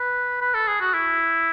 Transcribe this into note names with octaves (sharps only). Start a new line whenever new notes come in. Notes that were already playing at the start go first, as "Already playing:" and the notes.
Already playing: B4
B4
A4
G#4
F#4
E4